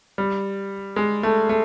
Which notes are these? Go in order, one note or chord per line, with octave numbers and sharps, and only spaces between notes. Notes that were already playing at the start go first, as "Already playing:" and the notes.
G3
G#3
A3
A3